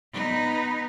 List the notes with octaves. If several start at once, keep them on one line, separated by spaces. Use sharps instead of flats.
B3 D#4